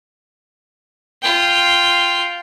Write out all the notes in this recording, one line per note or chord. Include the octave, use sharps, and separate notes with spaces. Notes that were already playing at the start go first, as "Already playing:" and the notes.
F4 G5